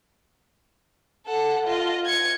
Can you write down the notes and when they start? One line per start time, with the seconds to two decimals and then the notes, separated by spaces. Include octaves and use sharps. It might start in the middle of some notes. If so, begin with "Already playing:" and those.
1.27 A4 F#5
1.67 F4 D#5
2.06 G#6 C#7